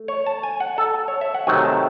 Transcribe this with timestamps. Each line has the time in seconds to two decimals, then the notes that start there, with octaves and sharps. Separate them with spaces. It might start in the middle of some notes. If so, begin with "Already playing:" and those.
Already playing: A3
0.08 C#5
0.26 A5
0.43 G#5
0.60 F#5
0.78 A4
1.08 C#5
1.21 E5
1.34 F#5
1.47 C3 D#3 F#3 A3 G#5
1.65 A5